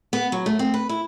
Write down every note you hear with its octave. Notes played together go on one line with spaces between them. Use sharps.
B3
F#3
A3
C4
B4
E4